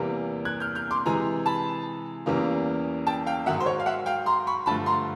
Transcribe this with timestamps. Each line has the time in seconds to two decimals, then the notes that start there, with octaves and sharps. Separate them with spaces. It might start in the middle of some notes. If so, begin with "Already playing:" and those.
Already playing: E2 C3 E3 G3 A#3
0.45 F#6 G#6
0.60 F6 G6
0.75 F6 G6
0.91 C6 D6
1.06 C3 E3 G#3 G#5 A#5
1.46 A5 B5
2.26 E2 C#3 E3 G3 A#3
3.07 G5 A5
3.26 F5 G5
3.46 G#2 D#3 F#3 E5 F#5
3.60 C5
3.66 C#5
3.80 F5
3.86 E5 F#5
4.06 F5 G5
4.26 A#5 C6
4.47 B5 C#6
4.66 G2 D3 F3 A3 A5 B5
4.86 A#5 C6